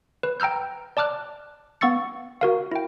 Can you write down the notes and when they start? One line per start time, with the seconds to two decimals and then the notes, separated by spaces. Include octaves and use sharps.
0.23 B4
0.40 G5 A#5 E6 F6 G6
0.97 D5 A5 D6 F6 F#6
1.81 B3 F5 C#6 E6 A6 C#7
2.41 F#4 A#4 F5
2.71 E4 G5